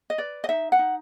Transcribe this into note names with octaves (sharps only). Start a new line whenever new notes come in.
D#5
B4 D5
D#5
D#4 E5
F#5
D#4